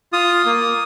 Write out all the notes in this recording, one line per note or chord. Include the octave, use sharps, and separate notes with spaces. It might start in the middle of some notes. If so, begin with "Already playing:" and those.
F4 D#6
A#3